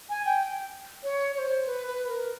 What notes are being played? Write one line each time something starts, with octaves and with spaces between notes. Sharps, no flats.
G#5
G5
C#5
C#5
C5
B4
B4
A#4